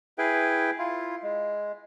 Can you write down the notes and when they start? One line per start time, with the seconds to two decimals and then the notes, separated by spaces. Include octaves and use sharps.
0.18 E4 G#4 B4 G5
0.78 E4 F4
1.23 G#3